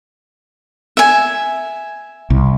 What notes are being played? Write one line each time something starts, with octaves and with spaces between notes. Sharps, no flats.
E5 G#5
C2